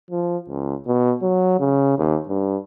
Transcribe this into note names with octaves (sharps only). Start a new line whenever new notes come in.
F3
C#2
B2
F#3
C#3
D#2
G2